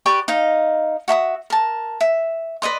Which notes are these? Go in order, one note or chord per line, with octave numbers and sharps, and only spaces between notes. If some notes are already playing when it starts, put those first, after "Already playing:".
G4 B4 D5 C#6
D#4 D#5 F5
F#4 E5 A#5 D#6
A#4 A5
E5
B4 D5 D#5 C6